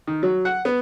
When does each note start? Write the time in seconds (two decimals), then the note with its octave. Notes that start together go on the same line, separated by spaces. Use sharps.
0.07 D#3
0.23 F#3
0.45 F#5
0.65 B3